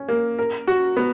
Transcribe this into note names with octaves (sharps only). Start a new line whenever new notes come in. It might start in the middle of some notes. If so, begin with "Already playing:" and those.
Already playing: C#4
A#3
A#4
F#4
B3